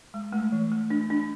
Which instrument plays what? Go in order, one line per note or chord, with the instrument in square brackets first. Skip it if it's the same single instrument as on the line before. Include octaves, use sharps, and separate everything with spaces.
[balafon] G#3
A3
E3
A3
D4
D4